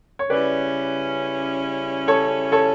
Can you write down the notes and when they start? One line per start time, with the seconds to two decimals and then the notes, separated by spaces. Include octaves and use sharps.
0.19 C#5
0.30 C#3 G3 C#4 E4 B4 D5
2.08 A4 C#5
2.52 A4 C#5